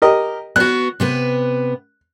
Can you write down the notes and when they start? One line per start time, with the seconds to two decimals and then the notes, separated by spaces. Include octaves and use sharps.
0.02 G4 A#4 D#5
0.56 B3 F#4 F#6
1.00 C3 B3 B4